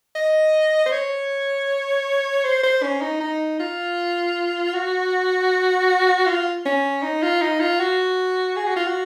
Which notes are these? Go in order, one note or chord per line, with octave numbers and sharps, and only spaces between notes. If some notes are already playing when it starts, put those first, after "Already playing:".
D#5
C5
C#5
C5
C5
C#4
D#4
D#4
F4
F#4
F4
C#4
D#4
F4
D#4
F4
F#4
G#4
F#4
F4
F#4